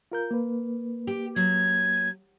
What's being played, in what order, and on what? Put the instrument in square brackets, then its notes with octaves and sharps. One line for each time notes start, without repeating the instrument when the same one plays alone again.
[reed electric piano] F4 A#4 G6
A#3 B4
[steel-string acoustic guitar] G4
[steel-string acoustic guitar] F#3 [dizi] G#6